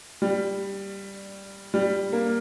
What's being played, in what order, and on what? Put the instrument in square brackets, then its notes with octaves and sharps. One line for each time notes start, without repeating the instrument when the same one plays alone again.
[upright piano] G3
G3
A#3